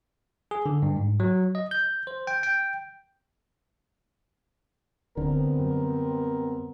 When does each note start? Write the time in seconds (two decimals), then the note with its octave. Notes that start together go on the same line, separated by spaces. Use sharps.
0.51 G#4
0.66 D3
0.82 G2
0.96 G#2
1.20 F#3
1.55 D#5
1.71 G6
2.07 C5
2.27 G5
2.43 G5
5.17 D1 D3 G3 B3 C4 A#4
5.60 F#2